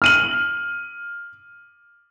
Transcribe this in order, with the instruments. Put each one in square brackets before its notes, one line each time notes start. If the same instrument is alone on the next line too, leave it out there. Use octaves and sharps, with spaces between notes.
[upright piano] F6 D#7 F#7